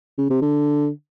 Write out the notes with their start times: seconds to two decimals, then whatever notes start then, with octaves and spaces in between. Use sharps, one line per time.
0.19 C#3
0.30 C3
0.42 D3